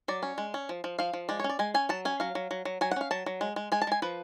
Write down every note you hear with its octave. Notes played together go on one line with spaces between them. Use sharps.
F#3 D5
C#4
G#3
C#4
F3
F3
F3 F5
F3
G#3 D5
C#5
C#4
D5
G#3 G#5
C#4 G#5
F#3 A5
C#4 G#5
F#3 F5
F#3
F#3
F#3
F#3 G#5
F#5
C#4 F5
F#3 A5
F#3
G#3
G#3
G#3 G#5
A5
G#3 G#5
F3 B4